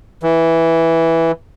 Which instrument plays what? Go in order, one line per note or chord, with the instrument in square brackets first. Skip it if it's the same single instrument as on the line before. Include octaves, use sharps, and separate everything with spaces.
[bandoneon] E3